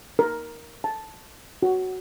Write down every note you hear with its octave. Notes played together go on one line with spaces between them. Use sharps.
A#4
A5
F#4